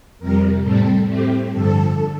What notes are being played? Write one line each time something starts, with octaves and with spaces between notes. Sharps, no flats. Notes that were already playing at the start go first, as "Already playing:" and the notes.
F2 C3 G3 A#4
A2 G3 C4 A4
A2 A3 C4 G4
G2 D3 F3 A4